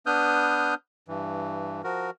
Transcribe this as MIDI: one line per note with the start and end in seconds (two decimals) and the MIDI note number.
0.06 0.75 59
0.06 0.75 62
0.06 0.75 71
0.06 0.75 87
0.06 0.75 89
0.06 0.75 91
1.08 1.82 43
1.08 1.82 52
1.84 2.10 53
1.84 2.10 66
1.84 2.10 70